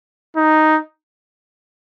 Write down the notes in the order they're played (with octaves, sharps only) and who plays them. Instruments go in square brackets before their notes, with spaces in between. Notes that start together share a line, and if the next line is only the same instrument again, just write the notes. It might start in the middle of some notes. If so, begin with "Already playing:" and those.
[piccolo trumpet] D#4